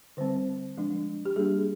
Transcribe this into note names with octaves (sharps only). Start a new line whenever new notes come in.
D3 G3 C4 C5
F3 G#3 D4
G4
G3 A#3 D4 G#4